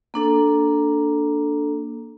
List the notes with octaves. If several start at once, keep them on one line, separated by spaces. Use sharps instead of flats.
A#3 D4 A4